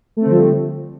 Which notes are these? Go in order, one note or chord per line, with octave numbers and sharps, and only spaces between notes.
D3 F3 G3 A3 C4